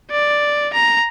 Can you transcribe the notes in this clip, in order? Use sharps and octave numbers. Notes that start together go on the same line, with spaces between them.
D5
A#5